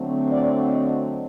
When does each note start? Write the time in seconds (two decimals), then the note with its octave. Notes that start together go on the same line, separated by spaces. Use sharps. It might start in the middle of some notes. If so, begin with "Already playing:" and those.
Already playing: D3 F#3 A3 C4
0.30 D5
0.70 D#5